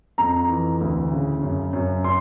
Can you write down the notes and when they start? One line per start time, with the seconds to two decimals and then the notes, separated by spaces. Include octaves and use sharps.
0.18 F2 A#5
0.49 E3
0.81 D2
1.11 C#3
1.43 F#2
1.73 F#2
2.04 C6